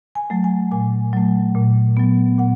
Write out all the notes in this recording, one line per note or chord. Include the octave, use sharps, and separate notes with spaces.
G#5
F#3 A3
G#5
A#2 G#5
F#3 A3
A#2
F#3 B3
A#2 F#5